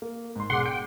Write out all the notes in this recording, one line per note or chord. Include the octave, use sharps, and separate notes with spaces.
A#3
G#2 C6
E1 G#4 F#5 C6 D6
G5 C#7